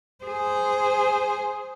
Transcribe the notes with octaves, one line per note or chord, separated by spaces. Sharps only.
G#4 C5